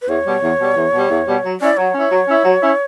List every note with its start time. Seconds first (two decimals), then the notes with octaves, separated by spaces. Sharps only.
0.02 B4
0.09 E2 C#5
0.25 B2 G3
0.43 E2
0.60 B2 G3
0.76 E2
0.93 B2 G3
1.11 E2
1.27 B2 G3
1.44 F#3
1.60 C#4 E4 D5
1.77 F#3 C#5
1.94 C#4 E4
2.11 F#3
2.28 C#4 E4
2.45 F#3
2.62 C#4 E4